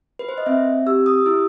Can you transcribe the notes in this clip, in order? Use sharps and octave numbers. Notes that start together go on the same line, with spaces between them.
B4
C5
D#5
C4 E5
G4 E6
D#6
E4 E6